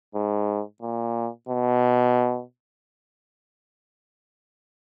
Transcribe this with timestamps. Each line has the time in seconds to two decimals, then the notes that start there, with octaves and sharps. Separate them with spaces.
0.15 G#2
0.82 A#2
1.49 B2